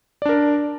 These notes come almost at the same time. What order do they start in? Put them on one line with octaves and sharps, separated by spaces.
D5 D4 A#4